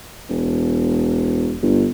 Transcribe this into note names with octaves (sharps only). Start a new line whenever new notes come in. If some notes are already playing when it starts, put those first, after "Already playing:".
E1
G1